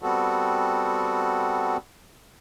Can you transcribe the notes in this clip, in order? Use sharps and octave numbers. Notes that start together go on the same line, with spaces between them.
G3 B3 C4 F#4 A4